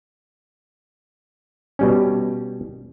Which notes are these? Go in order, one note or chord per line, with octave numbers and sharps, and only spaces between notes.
B2 G3 C#4